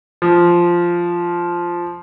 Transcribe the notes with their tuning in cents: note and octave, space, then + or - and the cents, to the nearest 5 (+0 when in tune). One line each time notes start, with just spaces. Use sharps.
F3 -5